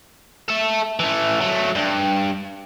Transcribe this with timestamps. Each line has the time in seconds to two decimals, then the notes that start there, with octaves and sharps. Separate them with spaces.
0.49 A4 E5
0.99 E3 A3
1.41 F#3 A3
1.76 G2